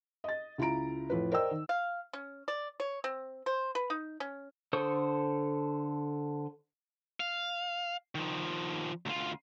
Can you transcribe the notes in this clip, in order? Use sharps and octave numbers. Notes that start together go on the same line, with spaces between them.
D#5 A6
C#2 E4 F4 A#5 D7
F2 A2 F4 B4
A#4 C5 D5 D#5 G5 E6
D#3
F5
C#4
D5
C#5
C4
C5
B4
D#4
C#4
D3 A4 C5 C#6 D#6
F5
D#3 F3
D2 F4